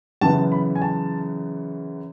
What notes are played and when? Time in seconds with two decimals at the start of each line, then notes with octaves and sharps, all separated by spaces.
0.21 F#2 C#3 E3 B3 A5
0.52 B5
0.75 G#5
0.82 A5